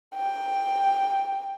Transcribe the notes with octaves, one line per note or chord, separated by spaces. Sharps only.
G5